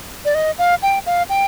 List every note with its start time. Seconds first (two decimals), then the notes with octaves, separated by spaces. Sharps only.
0.25 D5
0.35 D#5
0.58 F5
0.82 G5
1.06 F5
1.29 G5